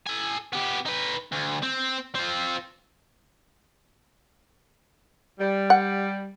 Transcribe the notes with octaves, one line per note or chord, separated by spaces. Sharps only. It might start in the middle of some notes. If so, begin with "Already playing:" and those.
A4 G#5
B3 G4
D#4 B4
D2
C4
C4 F4
G3
F#5